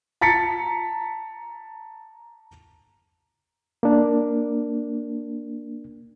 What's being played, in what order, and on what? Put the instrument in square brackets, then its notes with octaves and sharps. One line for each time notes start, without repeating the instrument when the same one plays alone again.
[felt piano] A5 A#5 A6 B6 C#7
[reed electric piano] A#3 D4